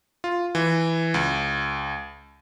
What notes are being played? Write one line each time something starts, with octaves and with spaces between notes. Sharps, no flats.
F4
E3
C#2